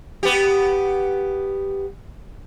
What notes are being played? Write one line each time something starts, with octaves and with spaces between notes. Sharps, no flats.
B3 G4